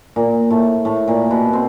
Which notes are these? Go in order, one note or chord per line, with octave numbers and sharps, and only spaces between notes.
A#2 A#3
A2 A3
A2 A3
A#2 A#3
B2 B3
C4